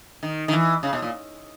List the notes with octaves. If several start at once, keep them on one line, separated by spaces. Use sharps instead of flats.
D#3
D#3
E3
C#3
B2
A#2